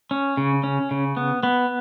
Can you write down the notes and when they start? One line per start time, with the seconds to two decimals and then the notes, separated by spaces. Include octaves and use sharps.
0.11 C#4
0.37 C#3
0.64 C#4
0.91 C#3
1.17 B3
1.43 B3